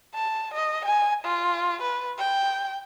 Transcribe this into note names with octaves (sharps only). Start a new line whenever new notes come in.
A5
D#5
G#5
F4
B4
G5